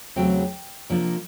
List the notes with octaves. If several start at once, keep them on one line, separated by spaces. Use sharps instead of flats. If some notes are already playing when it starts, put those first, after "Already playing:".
E2 C#3 F#3 A3 C4 G5
C3 F3 A#3 D4